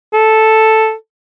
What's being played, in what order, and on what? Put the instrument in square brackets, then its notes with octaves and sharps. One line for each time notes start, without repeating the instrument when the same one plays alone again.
[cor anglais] A4